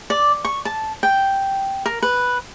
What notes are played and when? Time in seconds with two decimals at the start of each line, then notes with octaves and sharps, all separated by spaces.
0.10 D5
0.45 C#6
0.65 A5
1.03 G5
1.86 A#4
2.03 B4